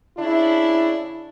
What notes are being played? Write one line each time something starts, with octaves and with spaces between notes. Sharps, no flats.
C#3 D4 E4